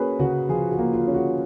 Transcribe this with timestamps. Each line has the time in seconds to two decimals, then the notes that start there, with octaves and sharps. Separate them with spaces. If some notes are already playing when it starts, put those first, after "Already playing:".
Already playing: A#3 C#4 F#4 G#4 A#4 B4
0.19 C#3 F#4
0.49 F3 F4 G#4
0.71 F#4
0.78 A#3
0.93 F4
1.07 C#4
1.14 F#4